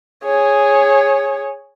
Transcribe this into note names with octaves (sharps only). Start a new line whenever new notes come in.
G#4 C#5